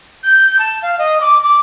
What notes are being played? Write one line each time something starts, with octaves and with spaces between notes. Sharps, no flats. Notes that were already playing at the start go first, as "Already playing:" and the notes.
G6
A5
F5
D#5
D6
D6